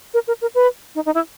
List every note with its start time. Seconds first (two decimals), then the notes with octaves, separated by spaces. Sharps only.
0.14 A#4
0.28 A#4
0.42 A#4
0.55 B4
0.95 D#4
1.06 D#4
1.15 E4